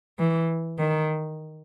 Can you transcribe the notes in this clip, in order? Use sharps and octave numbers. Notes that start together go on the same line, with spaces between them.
E3
D#3